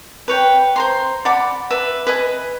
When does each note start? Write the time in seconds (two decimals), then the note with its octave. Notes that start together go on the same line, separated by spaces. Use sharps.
0.28 B4 C#5 G5
0.76 C5 A#5 C6
1.25 D5 F#5 B5 D6
1.70 B4 E5
2.07 B4 D#5 G#5